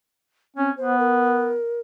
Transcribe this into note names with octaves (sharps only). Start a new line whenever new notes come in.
C4 C#4
B3 C5
A#4